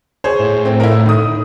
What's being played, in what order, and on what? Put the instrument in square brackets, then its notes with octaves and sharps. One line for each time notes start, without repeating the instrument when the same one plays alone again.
[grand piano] G#4 C5 C#5
[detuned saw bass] A2
[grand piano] C4
E4 A#4
D#3 D#6